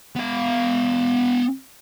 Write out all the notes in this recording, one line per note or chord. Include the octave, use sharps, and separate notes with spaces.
B3 F5